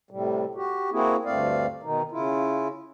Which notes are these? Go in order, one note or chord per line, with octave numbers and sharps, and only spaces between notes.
A2 C3 G3
F#4 G4
A#3 C4 E4 F#4 G#4
D2 G2 A3 C4 D5 F5
B2 D#3 D#4
C#3 E4 F4